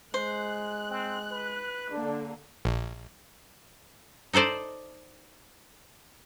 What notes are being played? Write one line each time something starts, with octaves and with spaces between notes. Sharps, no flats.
G#3 C5 F#6
C4
B4
D3 A#3 D4
A#1
D#4 A4 C5 D5 D#5